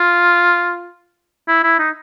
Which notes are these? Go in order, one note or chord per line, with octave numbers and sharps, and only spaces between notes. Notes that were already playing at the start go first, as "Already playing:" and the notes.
Already playing: F4
E4
E4
D#4